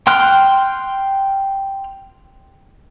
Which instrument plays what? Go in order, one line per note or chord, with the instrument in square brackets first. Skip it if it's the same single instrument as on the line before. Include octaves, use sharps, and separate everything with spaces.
[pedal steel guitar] G5 C6 F6 F#6